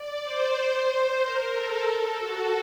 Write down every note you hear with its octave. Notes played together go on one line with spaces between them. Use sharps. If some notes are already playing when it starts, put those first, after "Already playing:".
Already playing: D5
C5
A#4
A4
A4
F#4